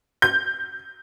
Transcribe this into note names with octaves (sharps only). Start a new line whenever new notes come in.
G6